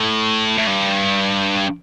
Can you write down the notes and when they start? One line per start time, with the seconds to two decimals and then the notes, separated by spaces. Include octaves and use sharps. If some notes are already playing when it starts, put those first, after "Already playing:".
Already playing: A2
0.58 A2
0.67 G2